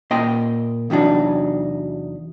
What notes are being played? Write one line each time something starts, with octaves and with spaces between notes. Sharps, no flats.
A#2 D#5 G5 C6
E2 C3 F#3 D4 D#4